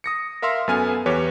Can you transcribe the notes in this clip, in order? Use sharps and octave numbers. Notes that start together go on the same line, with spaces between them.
D#6 A#6 C#7
A#4 E5 F5 C6 E6
F#2 B3 A4 G#5 F6 D#7
E2 G4 B4 C#5